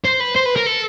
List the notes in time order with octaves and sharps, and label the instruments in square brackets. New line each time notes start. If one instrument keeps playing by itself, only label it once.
[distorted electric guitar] C5
B4
C5
B4
A#4
A4